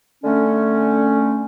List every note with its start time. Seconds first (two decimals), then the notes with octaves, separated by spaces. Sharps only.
0.24 D3 A3 C#4